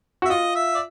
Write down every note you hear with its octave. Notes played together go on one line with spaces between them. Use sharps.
F#4 E5
F4 D#5
E5
D5